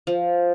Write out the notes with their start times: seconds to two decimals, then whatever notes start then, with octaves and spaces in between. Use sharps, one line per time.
0.07 F3